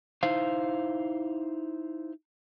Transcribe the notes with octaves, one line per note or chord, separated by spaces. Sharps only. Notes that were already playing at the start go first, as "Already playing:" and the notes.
D#4 E4 C5 F5